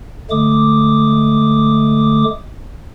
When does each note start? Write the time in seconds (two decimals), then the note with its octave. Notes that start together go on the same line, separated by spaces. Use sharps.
0.30 D3 G#3 A3 D6 D#6